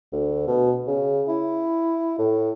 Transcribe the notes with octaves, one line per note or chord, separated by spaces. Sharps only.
D2
B2
C#3
E4
A2